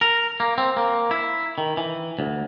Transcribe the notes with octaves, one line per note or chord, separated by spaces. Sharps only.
A#4
A#3
C4
A#3
E4
D#3
E3
D2